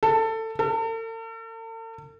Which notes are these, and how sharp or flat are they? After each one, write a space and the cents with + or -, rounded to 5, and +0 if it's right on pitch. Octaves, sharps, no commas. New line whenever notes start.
A4 +20
A4 +45